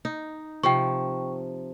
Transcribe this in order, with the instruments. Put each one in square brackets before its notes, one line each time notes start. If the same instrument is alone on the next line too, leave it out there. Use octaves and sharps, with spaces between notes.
[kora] D#4
[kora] C3 F3 [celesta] G5 C#6